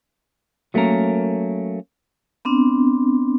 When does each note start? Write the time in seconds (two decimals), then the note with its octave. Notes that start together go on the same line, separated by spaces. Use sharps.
0.74 F#3 A3 A#3 C#4 A#4
2.45 B3 C4 D4